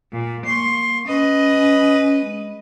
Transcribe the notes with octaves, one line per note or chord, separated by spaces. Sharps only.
A#2
A#3 C6 C#6
C#4 B4 D#5
G#3